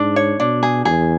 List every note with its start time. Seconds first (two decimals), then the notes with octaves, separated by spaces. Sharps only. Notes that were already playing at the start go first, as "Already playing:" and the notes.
Already playing: G#2 D4
0.16 C#5
0.40 B2 D4
0.63 G#4
0.85 E2 G#4